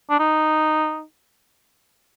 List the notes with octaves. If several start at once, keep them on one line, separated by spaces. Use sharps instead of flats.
D4
D#4